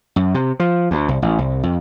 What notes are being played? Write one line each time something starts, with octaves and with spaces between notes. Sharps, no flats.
F#2
C3
F3
D2
C2
A1
C2
F2